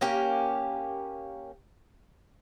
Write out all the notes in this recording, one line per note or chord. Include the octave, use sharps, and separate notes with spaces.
A#3 C#4 G4